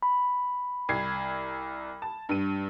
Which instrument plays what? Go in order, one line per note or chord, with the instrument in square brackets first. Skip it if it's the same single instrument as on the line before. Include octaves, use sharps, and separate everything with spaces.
[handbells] B5
[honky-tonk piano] C2 G#6 C7
A5
G2 D#7